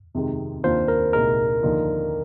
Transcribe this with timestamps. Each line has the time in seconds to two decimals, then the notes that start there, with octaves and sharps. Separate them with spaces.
0.14 F2 C3 D#3 G#3
0.63 D#2 D#3 A#3 D4 F4 C5
0.88 A#4
1.13 C2 A#2 G#3 D#4 A#4
1.62 D#2 D3 F3 A#3 D#4